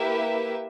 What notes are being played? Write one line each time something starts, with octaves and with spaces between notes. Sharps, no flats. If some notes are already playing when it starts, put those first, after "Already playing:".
Already playing: A#3 E4 G4 B4 E5